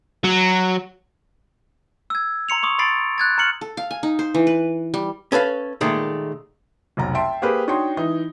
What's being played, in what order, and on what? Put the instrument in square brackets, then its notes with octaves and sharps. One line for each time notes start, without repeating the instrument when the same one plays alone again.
[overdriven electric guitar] F#3
[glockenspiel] E6 G#6
A#5 C6 C#7 F7
C6 C#6 D#6
B5 C6 A6 C7 D7
F#6 G#6 A6
A#5 F6 C#7 F#7
[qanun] A4
F5
G#5
D#4
C5
E3
B4
G3
[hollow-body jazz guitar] C#4 A4 B4 F5
A#2 D#3 G#3 A3
[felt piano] F1 B1 A#5
E5 G5 A5 C6 D7
A#3 G4 G#4 B4 C5
D4 D#4 F#4 C#5 G5 C6
E3 D#4